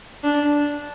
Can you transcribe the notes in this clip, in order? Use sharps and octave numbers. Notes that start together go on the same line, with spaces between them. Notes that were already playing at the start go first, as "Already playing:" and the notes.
D4